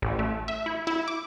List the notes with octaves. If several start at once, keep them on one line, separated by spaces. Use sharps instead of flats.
A1
A3
E5
E4
E4
D6